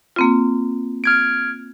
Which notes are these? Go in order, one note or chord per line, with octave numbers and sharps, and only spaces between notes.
A#3 C4 F4
F6 G#6 D7